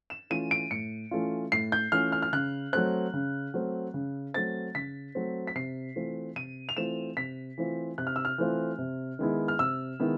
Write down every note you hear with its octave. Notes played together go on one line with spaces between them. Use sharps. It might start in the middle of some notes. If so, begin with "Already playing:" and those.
E7
E3 A3 C#4 F4 D#7
D7
A2 C#7
E3 A3 C#4 F4
A2 C7
G6
E3 A3 C#4 F4 F6
F6
F6
C#3 F#6
F#3 A3 C4 F#6
C#3
F#3 A3 C4
C#3
F#3 A3 C4 A6
C#3 B6
F#3 A3 C4
B6
C3 C7
E3 A3 C4 F4
C3 D#7
F7
E3 A3 C4 F4 E7
C3 B6
E3 A3 C4 F4
C3 F#6
F6
E6
F6
E3 A3 C4 F4
C3
D#3 G#3 B3 E4
F6
C3 E6
D#3 G#3 B3 E4